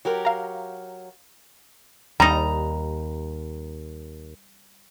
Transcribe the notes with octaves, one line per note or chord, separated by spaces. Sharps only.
F#3 G4 A#4
F5 A#5
D#2 G3 D#4 A#5